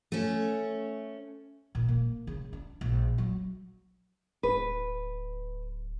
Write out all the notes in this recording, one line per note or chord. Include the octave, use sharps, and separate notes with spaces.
A3 C#4
A#2
A#3
C#3
D4
A#1
F#3
D1 B4